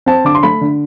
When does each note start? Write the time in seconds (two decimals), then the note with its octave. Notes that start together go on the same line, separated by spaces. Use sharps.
0.06 C4 A5
0.24 D3 D6
0.35 C6
0.43 A3 B5
0.61 D3